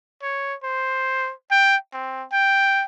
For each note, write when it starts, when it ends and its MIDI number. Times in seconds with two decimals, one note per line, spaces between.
0.22 0.54 73
0.63 1.32 72
1.51 1.76 79
1.93 2.25 60
2.32 2.85 79